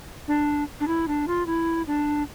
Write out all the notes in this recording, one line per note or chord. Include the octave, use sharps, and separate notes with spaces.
D4
D4
E4
D4
F4
E4
D4